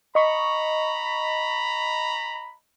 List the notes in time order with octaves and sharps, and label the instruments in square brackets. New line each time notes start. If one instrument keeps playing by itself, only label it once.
[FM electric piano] D#5 C#6 [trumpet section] A#5 B5